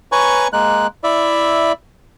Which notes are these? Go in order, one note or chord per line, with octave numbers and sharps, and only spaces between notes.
B4 C#5 G#5 A#5 C#6
G#3 A#3 F#6
E4 D5 E5